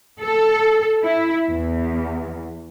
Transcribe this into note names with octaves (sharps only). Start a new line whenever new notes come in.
A4
E4
E2